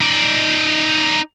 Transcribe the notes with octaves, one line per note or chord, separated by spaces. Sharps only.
D#4 D5